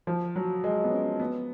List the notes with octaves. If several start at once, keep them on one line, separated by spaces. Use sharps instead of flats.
F3
F#3
G#3
B3
C#4
B3